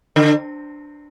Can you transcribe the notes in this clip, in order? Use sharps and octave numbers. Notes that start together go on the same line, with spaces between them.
D3